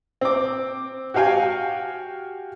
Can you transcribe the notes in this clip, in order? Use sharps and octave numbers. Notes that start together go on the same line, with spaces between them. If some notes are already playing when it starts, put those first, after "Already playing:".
C4 D6
F#4 G4 F5 G5 G#5